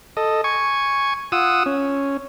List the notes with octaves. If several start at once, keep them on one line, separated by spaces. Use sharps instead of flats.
A4 D#5
G#5 C#6
F4 F#5 D#6 E6
C#4